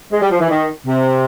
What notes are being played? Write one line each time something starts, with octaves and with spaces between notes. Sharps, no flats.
G#3
G3
F3
E3
D#3
C3